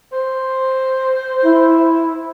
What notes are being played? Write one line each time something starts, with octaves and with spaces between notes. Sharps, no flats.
C5
E4